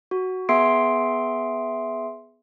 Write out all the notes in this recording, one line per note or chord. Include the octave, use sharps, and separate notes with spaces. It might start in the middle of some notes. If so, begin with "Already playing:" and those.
F#4
B3 G#4 E5 C6 C7 D7